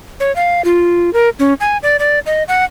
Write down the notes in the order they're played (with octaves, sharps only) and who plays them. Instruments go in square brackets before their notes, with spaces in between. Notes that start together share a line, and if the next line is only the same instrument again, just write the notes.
[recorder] C#5
F5
F4
A#4
C#4
G#5
D5
D5
D#5
F#5